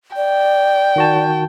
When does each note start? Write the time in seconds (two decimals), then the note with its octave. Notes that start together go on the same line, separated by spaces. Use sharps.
0.16 D5 G5
0.96 D#3 F#4 A5